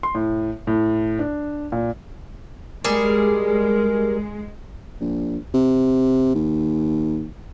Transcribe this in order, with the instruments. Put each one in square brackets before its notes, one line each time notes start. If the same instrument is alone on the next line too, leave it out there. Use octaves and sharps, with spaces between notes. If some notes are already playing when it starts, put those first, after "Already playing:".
[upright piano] C6
A2
A2
D4
A#2
[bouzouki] G3 G#4 [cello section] G#3 [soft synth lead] A#4
[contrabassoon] A#1
C3
D#2